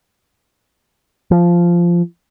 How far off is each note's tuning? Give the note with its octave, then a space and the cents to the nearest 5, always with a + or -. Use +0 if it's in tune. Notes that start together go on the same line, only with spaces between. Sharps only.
F3 -10